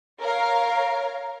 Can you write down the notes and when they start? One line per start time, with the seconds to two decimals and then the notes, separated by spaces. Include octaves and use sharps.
0.21 A#4 C#5 F5